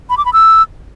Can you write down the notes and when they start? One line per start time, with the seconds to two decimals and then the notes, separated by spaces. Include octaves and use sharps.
0.10 B5
0.18 D6
0.25 B5
0.33 E6